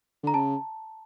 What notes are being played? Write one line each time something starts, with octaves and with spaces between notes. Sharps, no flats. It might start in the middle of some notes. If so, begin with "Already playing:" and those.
D3 A#5
C#3 A5